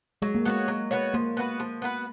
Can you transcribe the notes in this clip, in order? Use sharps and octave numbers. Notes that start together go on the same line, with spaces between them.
F#3 G#3
A#3
G#3 B3 F#4 C#5
F#3
B3 F#4 C#5
F3 A#3
B3 F#4 B4
F3
B3 F#4 B4